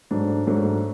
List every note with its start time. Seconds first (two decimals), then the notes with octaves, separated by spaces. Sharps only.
0.11 G#2 F#3 A3 D4
0.47 G#2 F#3 A3 D4